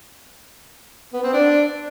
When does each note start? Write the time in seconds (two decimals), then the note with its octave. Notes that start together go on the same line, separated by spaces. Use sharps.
1.13 B3
1.23 C4
1.33 D4